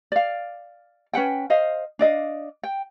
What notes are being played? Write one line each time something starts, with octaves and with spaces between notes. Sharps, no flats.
D5 F5
C#4 B4 F#5 G5
C5 D#5 F5
D4 D5 D#5 F5
G5